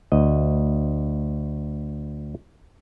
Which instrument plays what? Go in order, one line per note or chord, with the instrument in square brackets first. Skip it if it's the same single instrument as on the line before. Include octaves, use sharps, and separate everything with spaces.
[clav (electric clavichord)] D2 D#5